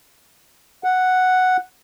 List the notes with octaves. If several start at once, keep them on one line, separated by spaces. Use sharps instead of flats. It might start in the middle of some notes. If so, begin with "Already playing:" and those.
F#5